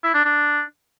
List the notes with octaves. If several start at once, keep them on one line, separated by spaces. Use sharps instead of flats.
E4
D4
D4